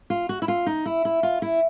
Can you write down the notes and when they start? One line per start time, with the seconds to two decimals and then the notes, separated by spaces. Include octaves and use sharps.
0.10 F4
0.29 F#4
0.42 E4
0.48 F4
0.67 D#4
0.86 E4
1.05 E4
1.23 F4
1.42 E4